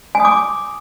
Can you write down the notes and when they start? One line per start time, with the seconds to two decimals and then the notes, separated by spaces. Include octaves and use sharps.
0.15 G#5
0.20 D#6
0.25 D6